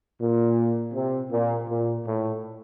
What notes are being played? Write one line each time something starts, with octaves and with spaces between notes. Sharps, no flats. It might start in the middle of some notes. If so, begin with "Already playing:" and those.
A#2
C3
A#2
A#2
A2